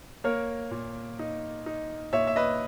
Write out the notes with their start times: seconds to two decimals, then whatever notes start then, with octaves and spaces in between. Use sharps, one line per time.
0.24 A#3 A#4 C#5
0.71 A#2
1.19 D#4
1.66 D#4
2.13 A#2 C#5 E5
2.27 E5
2.36 B4 D#5